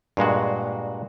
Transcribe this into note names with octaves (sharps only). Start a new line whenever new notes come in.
G2 A#2 G#3 F#4